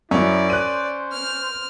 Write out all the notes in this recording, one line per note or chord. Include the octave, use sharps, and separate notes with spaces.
F#2 C#4 E4 D5
C5 F#6 D#7
F6